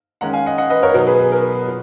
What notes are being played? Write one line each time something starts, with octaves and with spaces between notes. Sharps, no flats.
D#3 G#3 C#4 F#5 A#5
F5 G#5
D#5 F#5
D#5 F#5
B4 D#5
A#4 C#5
B2 F#3 B3 D#4 A#4
G#4 B4
G#4
A#4
A#2